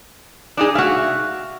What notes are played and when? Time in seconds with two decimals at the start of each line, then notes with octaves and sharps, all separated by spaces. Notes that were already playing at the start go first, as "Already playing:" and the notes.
0.57 D4 D#4 G#4
0.75 F#4 E5 F5